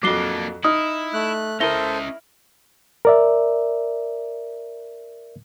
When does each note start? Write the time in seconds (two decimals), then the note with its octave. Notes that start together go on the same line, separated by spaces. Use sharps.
0.03 F2 F#3 A#3 D4 D6 C7 G7
0.64 D#4 E4 D#6 F6
1.14 A3 F#6
1.60 C#4 E4 A4 A#4 C5 D#5 A#6 G7
3.05 A#4 D5 E5